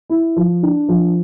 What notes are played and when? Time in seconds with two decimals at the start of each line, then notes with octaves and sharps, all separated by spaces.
0.10 E4
0.37 F3
0.63 D4
0.89 F3